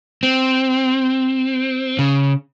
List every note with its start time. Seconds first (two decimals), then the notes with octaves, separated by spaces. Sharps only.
0.23 C4
1.99 C#3